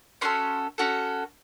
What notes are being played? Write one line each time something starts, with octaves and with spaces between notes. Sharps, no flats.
C#4 F#4 A4 C6
C#4 F#4 A4